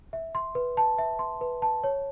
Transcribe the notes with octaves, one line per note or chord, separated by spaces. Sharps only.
E5
C6
B4
A5
E5
C6
B4
A5
C#5